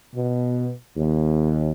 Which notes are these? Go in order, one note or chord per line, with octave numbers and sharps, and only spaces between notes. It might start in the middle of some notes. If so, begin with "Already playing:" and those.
B2
D#2